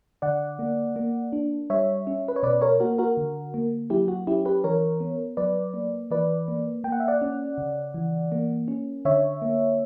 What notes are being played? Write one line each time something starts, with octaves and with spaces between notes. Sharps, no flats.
D3 D5 F#5
A#3
A#3
D4
G3 C#5 E5
C#4
B4
C#5
B2 B4 D5
A#4 C#5
A#3 F#4 A#4
F#4 A#4
D3
A#3
F#3 E4 G4
F#4
C#4 E4 G4
G4 B4
E3 A#4 C#5
B3
F#3 B4 D5
A#3
E3 B4 D5
A#3
A#3 G5
F#5
E5
D5 F#5
C#4
C#3
E3
A#3
C#4
D3 C#5 E5
A#3